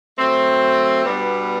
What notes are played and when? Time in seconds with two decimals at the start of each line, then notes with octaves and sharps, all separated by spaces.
0.18 F#3 A3 C4
1.04 B2 G3 B3 D4